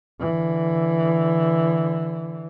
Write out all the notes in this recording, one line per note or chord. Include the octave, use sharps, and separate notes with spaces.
D3 E3